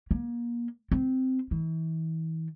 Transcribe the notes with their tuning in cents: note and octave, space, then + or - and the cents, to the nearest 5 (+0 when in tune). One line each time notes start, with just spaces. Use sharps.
A#3 +30
C4 -10
E3 -35